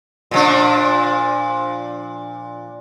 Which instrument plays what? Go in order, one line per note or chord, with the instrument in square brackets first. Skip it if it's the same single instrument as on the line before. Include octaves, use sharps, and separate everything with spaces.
[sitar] A#2 F3 D4